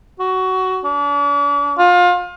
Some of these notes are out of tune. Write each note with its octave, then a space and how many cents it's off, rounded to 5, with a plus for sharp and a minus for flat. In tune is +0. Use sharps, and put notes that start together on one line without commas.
F#4 +15
D4 -40
F4 +25